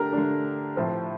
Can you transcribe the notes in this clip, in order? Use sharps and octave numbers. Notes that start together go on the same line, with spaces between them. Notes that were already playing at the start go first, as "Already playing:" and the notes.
Already playing: D3 A3 D4 G4 A#4 A#5
D3 A3 D4
A2 F3 C4